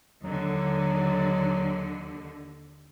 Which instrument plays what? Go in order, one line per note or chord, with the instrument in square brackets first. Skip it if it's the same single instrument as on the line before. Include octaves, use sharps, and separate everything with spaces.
[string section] D#2 D3 [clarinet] F#3